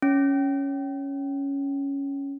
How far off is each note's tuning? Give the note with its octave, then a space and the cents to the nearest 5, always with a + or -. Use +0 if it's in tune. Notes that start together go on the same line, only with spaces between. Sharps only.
C#4 +5